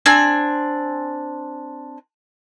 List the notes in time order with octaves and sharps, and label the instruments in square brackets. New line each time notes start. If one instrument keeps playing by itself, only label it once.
[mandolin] C4 D4 G#5